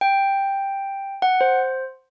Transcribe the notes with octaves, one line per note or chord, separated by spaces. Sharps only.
G5
F#5
C5